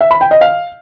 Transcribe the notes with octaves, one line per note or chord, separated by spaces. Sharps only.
E5
B5
G5
D#5
F5